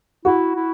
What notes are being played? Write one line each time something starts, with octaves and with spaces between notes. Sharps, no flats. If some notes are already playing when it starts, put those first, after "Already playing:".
E4 F#4
E4